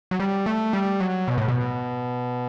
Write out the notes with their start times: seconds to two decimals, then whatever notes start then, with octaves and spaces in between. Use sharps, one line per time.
0.11 F#3
0.19 G3
0.46 A3
0.73 G3
1.00 F#3
1.28 B2
1.38 A2
1.48 B2